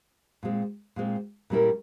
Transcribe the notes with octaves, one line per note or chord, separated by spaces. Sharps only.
A#2 G#3 C4
A#2 G#3 C4
A#2 G3 C#4 E4 A#4